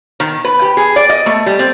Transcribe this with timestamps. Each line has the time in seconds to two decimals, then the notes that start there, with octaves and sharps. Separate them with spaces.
0.20 D#3
0.45 B4
0.62 G4
0.77 G#4
0.96 D5
1.09 D#5
1.26 A3
1.46 G3
1.59 C4